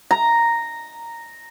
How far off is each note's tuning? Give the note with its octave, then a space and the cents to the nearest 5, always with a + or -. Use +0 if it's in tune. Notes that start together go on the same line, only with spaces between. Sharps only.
A#5 -5